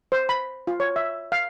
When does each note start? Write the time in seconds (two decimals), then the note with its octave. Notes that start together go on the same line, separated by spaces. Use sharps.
0.12 C5
0.29 B5
0.67 F4
0.80 C#5
0.96 E5
1.32 F5